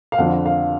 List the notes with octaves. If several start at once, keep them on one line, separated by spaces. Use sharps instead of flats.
F5
F2 D3 F3 F#5
F5